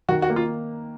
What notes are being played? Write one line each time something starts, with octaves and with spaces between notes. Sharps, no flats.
D#3 F#4
F#4
A#3
F4